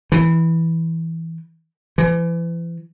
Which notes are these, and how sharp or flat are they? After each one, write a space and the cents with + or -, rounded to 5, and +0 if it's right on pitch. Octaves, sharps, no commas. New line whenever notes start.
E3 -5
E3 +35